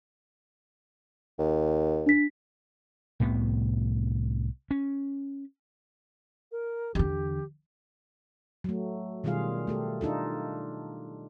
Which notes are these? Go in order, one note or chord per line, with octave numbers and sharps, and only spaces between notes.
D#2
D4 B6
C2 A2 C3 B3
C#4
A#4
E2 D3 G4
F#3 A3
B2 D#3 G3 F4 G#4 F5
A3 G4 A4
D4 D#4 F4 A4